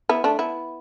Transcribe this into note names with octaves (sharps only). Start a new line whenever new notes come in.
B3 E4
A3 D4
B3 E4